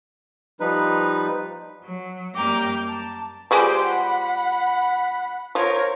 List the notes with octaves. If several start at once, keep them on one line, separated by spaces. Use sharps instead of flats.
F3 G3 D#4 B4
F#3
F#2 G3 A#3 G5 A#5 D6
A5
F3 G3 G#3 G4 C6
F#5 B5
F3 A#4 C#5